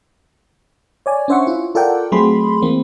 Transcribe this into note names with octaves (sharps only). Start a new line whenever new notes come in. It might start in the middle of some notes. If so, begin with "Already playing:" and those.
C#5 D5 G#5
C#4 D4 C5 E5 F#5 C#6
E4 F4
F4 A4 A#4 D5 F#5 G5
F#3 A3 C4 G#4 B5 C6
E3 A#3 C4